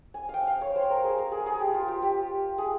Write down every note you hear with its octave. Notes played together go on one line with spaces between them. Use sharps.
G#5
F5 G5
F5
C#5
C5
A#4
G#4
A#4
G#4
G#4
G4
F4
G4
G4
G#4